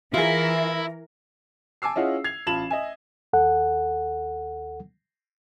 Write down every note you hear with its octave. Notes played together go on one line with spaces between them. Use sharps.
E3 E4 F4 G#4 A#4 E5
G#5 A5 D6 E6 C7
C#4 E4 F4 G#4 D#5 F#5
G#6 C7 F7
A1 F4 A5 B5 E7 F#7
D#5 E5 G#5
D#2 A4 F#5